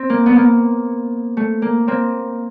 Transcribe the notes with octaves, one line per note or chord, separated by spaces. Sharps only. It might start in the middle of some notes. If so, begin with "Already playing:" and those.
Already playing: C4
A#3
B3
A#3
A3
A#3
A#3 C4